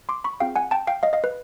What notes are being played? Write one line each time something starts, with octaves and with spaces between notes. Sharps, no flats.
C6 D6
B5 C#6
C4 F4 G#4 F5 G5
F#5 G#5
G5 A5
F5 G5
D#5 F5
D#5 F5
B4